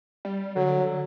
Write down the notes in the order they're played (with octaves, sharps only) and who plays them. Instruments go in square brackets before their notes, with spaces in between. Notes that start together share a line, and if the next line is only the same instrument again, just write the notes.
[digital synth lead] G3
[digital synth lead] D3 [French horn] F#3